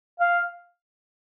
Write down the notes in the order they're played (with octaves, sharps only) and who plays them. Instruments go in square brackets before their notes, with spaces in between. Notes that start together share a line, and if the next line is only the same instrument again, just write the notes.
[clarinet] F5